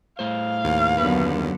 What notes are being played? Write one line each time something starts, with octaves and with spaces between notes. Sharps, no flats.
A2 C5 F5
D#2
F#2 D3 B3 B4